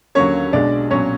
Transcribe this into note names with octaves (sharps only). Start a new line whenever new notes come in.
D#2 D3 F#3 A#3 C#4 C#5
B1 B2 G#3 D4 D5
B1 A#2 F#3 C#4 C#5